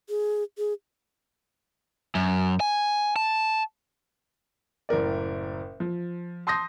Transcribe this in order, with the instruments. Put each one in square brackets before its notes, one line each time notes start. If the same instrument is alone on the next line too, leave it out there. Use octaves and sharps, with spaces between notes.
[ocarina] G#4
G#4
[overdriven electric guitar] F#2
G#5
A5
[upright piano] F#1 A2 A#4 D5
F3
A5 C6 D#6 G6 A#6